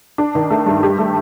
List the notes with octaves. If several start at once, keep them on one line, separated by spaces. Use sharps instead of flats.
D4
D#3
A3
G2
G4
A3